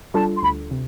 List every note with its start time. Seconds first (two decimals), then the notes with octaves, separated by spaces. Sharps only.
0.14 G3 D4 F4 A4 A5
0.38 C6
0.43 D2 B5
0.71 C3